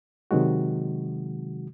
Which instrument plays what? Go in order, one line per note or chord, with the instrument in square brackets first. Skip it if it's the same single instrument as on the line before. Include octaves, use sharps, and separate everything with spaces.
[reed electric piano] C3 D#3 F#3 G#3 F#4